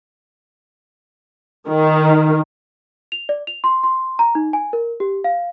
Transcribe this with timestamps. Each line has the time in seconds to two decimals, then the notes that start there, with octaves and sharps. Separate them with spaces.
1.69 D#3
3.12 F7
3.29 D5
3.47 F7
3.64 C6
3.84 C6
4.19 A#5
4.35 D#4
4.53 G#5
4.73 A#4
5.00 G4
5.24 F5